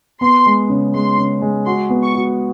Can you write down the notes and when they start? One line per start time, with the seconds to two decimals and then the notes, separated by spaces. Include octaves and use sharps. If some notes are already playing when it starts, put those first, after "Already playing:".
0.21 B3 C6
0.46 G#3
0.70 C#3
0.94 G#3 C6
1.18 C#3
1.42 G#3
1.66 F#4 C6
1.90 B3
2.03 C#6
2.15 F#4